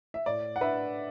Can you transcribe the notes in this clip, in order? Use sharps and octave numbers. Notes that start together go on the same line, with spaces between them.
E5
A2 D5
F#5
D4 B4 E5